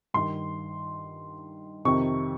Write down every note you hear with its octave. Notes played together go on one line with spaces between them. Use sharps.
G2 D#3 C6
F2 C3 D#3 C#6